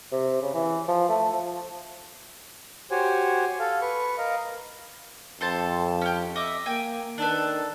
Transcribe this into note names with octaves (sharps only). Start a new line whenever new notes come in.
C3
C#3
E3
F3
A3
F3
F#4 G4 C5 C#5 G#5
A4 F5
B4 C#6
A#4 D#5 F5
F2 A4 C5 A5
C#4 G4
D#5 E5 D6
A#3 G5 G#5
D#3 D4 A4 B4